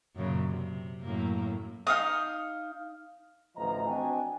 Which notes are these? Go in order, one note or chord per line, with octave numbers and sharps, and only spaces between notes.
F#2 A#2 C#3
C3
F#2 A2 A#3
D#4 F5 D#6
A1 D2 F3 B4 D#5 A#5
C4 D4 F#4 D#5 G5 G#5